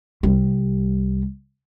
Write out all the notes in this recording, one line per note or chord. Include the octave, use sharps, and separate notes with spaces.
C2 G3